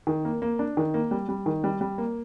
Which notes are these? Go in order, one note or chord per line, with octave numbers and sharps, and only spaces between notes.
D#3
A#3
A#3
D4
D#3
A#3
G3
G3
D#3
G3
G3
A#3